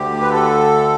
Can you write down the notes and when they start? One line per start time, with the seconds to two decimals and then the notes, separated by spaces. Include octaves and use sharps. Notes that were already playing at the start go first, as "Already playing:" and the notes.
Already playing: D2 D3 G4
0.21 B4
0.31 A4